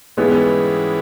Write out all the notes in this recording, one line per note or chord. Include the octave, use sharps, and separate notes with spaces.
G#2 E3 G3 G#3 B3 C#4 E4